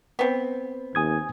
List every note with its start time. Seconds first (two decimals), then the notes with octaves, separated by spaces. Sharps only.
0.19 B3 C4
0.95 D#2 G#5 D#6 G#6